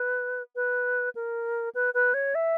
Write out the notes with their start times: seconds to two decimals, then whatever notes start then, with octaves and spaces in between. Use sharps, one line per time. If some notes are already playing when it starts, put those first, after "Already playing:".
Already playing: B4
0.56 B4
1.15 A#4
1.75 B4
1.94 B4
2.14 C#5
2.35 E5